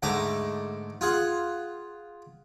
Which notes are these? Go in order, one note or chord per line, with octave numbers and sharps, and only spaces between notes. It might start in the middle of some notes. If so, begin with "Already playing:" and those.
G#2 D3 A3 A#5 D6
F4 G#4 F#5